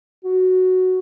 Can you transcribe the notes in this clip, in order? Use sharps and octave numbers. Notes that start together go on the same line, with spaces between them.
F#4